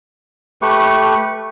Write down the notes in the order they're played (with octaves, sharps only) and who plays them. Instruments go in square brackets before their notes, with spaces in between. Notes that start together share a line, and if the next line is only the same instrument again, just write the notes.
[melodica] A3 G4 B4 C#6